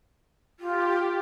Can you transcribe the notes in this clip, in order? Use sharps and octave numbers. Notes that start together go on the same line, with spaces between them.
F4 G4